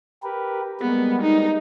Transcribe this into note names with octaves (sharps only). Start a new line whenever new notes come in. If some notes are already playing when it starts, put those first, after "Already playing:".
G4 A#4 B4
G3 G#3 A#3 B3
D#4